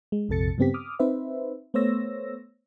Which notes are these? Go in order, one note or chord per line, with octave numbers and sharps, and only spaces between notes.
G#3
A#1 F2 C3 A4 A6 C#7
G2 C#3 B3 C4 G4 B6
D6 D#6 F6
C4 D#4 B4 C5 E5
A3 B3 C5 C#5 E6 A#6